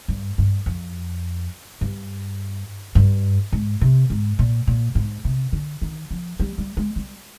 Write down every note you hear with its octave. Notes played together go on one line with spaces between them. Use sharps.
G2
G2
F2
G2
G2
G#2
C3
G#2
A#2
A#2
G#2
C3
D3
D#3
F3
G3
G3
G#3
G3